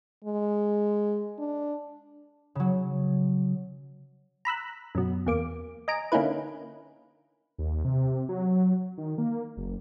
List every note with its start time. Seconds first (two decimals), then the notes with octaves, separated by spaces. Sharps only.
0.25 G#3
1.39 D4
2.55 C#3 F#3
4.45 A#5 B5 E6 F#6
4.95 F#2 B2
5.26 E2 A#3 D6
5.88 D#5 G#5 A#5 D7
6.12 D3 A#3 C#4 D#4 E4 B4
7.58 D#2
7.85 C3
8.29 F#3
8.98 D#3
9.18 A#3
9.57 F#1